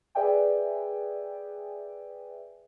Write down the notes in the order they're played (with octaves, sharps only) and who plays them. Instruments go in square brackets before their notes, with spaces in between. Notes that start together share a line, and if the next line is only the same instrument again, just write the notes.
[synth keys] G#4 B4 D5 E5 G5 G#5